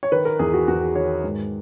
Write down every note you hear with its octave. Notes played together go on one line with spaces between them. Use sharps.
C#5
D#3 B4
A#4
E2 G#4
F#4
E2 F#4
D#3 C#5
G#2